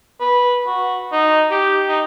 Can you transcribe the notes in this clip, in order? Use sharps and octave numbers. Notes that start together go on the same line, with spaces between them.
B4
F#4
D#4
G4
D#4